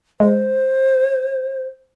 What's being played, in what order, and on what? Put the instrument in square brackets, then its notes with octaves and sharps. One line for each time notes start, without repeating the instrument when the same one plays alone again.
[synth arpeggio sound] G#3 [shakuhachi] C5